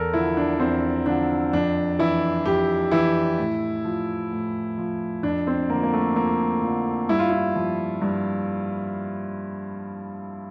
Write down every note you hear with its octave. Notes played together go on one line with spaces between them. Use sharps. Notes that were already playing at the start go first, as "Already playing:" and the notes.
Already playing: E2 A4 A#4
D3 F3 E4
D4
E2 C4
D3 F3 D4
F2 D4
E3 E4
F2 G4
E3 E4
A2
F3
A2
F3
F2 D4
C4
D3 A#3
F3
A#3
A3
F2 A#3
D3 F3
G2 E4
F4
E4
F3
G2